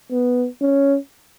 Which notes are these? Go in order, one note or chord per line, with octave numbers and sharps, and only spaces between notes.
B3
C#4